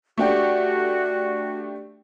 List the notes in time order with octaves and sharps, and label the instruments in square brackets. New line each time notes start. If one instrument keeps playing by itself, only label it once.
[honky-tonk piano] A3 D4 G4 [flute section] F#4